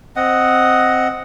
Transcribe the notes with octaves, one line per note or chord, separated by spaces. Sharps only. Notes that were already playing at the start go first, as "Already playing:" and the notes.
C4 D#5 F#5